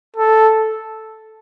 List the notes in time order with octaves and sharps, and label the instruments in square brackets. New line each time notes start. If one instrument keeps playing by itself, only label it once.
[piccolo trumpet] A4